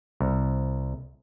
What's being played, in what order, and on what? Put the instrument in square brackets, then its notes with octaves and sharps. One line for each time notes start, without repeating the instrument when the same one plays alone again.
[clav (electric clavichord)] C2